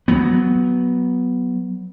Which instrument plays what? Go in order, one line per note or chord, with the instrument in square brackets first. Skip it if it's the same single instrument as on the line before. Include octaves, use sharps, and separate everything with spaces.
[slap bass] F#3 B3